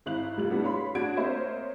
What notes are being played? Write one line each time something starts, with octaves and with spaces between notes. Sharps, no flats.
G#1 C4 E4 F5 F#6 F#7
F1 G3 F4 F#7
G3 A3 B3 D4 E4 F#4
C#5 F5 B5 C6
D4 F#4 G#4 D5 G#6 D7
A#3 C4 C5 C#5 D#5 E5